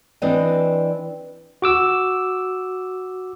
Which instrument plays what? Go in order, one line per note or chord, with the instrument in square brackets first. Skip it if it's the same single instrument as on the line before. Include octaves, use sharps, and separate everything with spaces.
[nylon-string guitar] E3 C4 D4 B4 D5 D#5
[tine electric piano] F#4 D6 E6